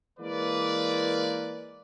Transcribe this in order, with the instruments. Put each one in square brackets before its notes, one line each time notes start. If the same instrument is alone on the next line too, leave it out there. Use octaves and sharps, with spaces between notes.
[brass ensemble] E3 G#3 A#3 B4 D5